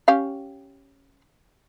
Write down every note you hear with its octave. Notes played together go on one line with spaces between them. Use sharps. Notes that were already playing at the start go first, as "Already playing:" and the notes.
C#4 G4 F5